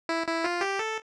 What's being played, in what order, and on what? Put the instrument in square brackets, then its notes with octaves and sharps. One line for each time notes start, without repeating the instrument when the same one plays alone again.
[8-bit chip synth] E4
E4
F4
G4
A4